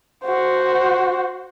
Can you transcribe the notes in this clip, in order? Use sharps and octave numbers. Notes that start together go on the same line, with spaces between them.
F#4 C5